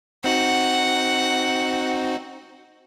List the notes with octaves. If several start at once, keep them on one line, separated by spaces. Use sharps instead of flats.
C4 D#4 F#4 F#5